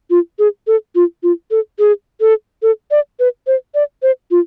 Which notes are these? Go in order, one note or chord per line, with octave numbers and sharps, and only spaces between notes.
F4
G#4
A4
F4
F4
A4
G#4
A4
A4
D5
B4
C5
D5
C5
F4